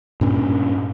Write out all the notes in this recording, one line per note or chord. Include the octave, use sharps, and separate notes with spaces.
G2 A#2 C#4